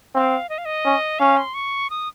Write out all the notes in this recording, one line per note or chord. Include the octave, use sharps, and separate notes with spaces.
C4 F5
D#5
F5
D#5
C#4
C#4 F5
C6
C#6
D#6